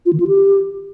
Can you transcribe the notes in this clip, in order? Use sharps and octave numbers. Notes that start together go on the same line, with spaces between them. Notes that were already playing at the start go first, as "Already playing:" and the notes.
F4
D#3
F4
G4